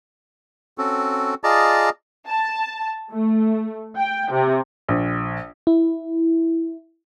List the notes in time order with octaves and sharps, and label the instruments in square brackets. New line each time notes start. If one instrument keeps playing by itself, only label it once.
[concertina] C4 C#4 F#4 A4
F4 G#4 D5 D#5 A5 A#5
[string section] A5
A3
G5
C3
[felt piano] A#1
[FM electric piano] E4